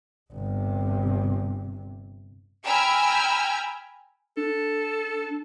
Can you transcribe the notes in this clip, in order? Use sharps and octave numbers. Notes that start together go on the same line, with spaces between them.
G1 C3
G5 G#5 A#5 B5 E6 F6
D4 A4